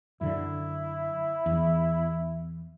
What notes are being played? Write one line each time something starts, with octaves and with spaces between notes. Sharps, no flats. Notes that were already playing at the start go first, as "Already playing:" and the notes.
F#2 D3 E4
E2